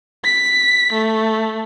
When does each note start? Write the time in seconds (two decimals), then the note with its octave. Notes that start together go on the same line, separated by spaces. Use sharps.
0.24 B6
0.93 A3